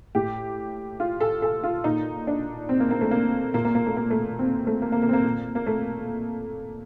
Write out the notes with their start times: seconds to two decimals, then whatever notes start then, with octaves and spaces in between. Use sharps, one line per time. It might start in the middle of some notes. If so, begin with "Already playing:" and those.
0.15 A2 G4
1.00 F4
1.20 A4
1.42 A4
1.64 F4
1.84 A#2 D#4
2.27 D4
2.69 C4
2.80 A#3
2.91 A#3
3.01 A3
3.11 A#3
3.54 A#2 A#3
3.65 A#3
3.75 A#3
3.86 A3
3.97 A#3
4.10 A3
4.39 C4
4.67 A3
4.82 A#3
4.92 A#3
5.02 A#3
5.09 C4
5.13 A#3
5.24 A#2
5.55 A#3
5.67 A3